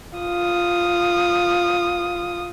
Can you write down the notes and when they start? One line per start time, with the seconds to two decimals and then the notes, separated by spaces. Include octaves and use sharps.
0.19 F4 D#6